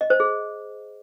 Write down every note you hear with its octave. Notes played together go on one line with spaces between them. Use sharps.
D#5
C5
G#4